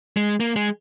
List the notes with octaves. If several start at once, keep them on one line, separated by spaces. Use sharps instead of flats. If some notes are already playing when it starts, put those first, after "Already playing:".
G#3
A#3
G#3